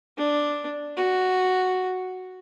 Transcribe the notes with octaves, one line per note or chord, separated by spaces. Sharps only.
D4
F#4